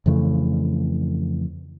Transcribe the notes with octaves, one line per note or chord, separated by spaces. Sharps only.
F2 C#3 E3 A3